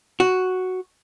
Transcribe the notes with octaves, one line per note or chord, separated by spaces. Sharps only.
F#4